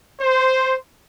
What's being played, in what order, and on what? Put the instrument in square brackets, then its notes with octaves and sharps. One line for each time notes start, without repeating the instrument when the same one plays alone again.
[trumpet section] C5